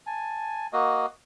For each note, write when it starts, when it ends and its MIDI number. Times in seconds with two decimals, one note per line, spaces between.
0.07 0.67 80
0.07 0.67 81
0.73 1.06 58
0.73 1.06 66
0.73 1.06 75